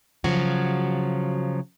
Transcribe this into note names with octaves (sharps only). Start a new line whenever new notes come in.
C#3 F3 F#3 F#4